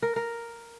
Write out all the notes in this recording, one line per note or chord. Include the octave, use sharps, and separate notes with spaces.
A#4
A#4